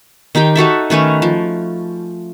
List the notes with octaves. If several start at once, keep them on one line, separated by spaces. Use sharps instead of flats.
D#3 D#4 G4 G5
D#4 F#4 A4 E5
D#3 A3 C#4 B4
F3